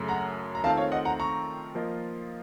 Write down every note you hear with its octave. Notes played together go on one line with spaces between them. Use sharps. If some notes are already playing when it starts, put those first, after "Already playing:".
Already playing: F#2 C#3 A3
F#5 A#5
A#5
D#3 A3 C4 F4 F5 A5
C#5 F5
D#5 F#5
F#5 A#5
A#5 C#6
F3 A#3 F4 A#4 D#5